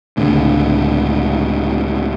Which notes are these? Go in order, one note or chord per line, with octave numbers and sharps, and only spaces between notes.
C#2 A2 D3